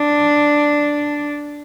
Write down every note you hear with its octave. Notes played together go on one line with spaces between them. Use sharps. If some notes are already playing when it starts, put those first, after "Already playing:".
Already playing: D4